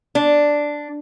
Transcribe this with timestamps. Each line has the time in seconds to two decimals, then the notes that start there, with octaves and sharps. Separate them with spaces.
0.15 D4